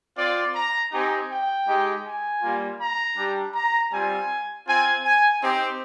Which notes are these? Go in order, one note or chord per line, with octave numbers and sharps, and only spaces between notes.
C4 F4 D5
A#5
C4 D#4 G4 G#5
G5
G#3 D#4 G4
G#5
G3 A#3 F4
A#5
G3 D4 G4
A#5
G3 C4 F4 G#5
C4 F4 G#5
G#5
C4 D#4 G4